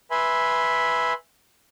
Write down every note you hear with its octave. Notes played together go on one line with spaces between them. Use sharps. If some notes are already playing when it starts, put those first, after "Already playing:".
B4 E5 G#5 B5 C6